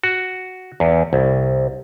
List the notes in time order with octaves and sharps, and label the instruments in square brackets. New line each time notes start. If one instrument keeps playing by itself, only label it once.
[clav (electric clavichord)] F#4
E2
C2